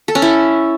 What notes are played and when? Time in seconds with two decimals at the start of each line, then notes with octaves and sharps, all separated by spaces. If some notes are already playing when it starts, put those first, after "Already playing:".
0.08 A4
0.15 C#4
0.22 E4